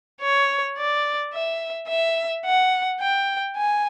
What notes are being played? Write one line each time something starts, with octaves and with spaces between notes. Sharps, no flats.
C#5
D5
E5
E5
F#5
G5
G#5